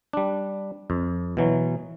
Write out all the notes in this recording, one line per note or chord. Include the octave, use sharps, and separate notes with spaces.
G3 D4
F2
B2 E3 F#3